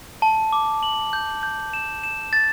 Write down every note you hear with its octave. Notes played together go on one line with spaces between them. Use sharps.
A5
D6
F#7
G6
G6
E7
E7
A6